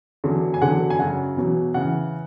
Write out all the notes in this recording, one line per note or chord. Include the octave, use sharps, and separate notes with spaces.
E2 D3 F#3
G#5
E2 D3 F#3 F#5
G#5
F#2 C#3 F#3 F#5
E2 B2 F#3
C#3 E3 F#5